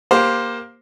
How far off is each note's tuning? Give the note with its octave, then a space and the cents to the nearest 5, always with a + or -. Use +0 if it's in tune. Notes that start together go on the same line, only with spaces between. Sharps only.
A#3 +15 G4 +10 C5 +0